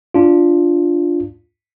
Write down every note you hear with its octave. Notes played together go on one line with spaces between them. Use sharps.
D4 F4